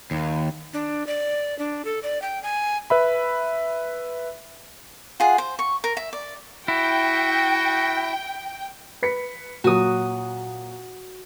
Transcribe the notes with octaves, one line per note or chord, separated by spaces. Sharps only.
D#2
D4
D5
D4
A4
D5
G5
G#5
B4 E5 B5
F4 G#4 F#5
C5
C#6
A#4
E5
D5
E4 F#4 G5
B4 B6 C#7
A#2 F#3 F#4 D#6